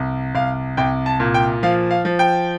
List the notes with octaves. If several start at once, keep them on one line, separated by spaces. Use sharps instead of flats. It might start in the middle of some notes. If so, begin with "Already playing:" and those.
Already playing: C2
C2 F5
C2 G5
A5
A#2
G5
F3 F5
F5
F3
G5